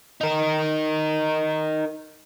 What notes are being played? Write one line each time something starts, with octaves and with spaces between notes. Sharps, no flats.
D#4 A#4